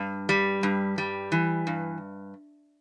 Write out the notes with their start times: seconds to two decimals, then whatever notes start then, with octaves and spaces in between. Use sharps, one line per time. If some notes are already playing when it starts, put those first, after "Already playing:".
Already playing: G2
0.29 G3
0.63 G2
0.98 G3
1.32 E3
1.67 G2